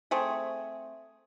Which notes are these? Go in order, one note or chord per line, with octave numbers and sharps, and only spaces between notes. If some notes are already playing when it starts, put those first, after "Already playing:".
A3 C4 G#4